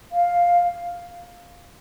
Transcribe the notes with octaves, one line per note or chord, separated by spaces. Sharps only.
F5